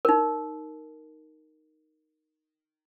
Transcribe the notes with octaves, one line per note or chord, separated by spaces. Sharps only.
D#4 A#4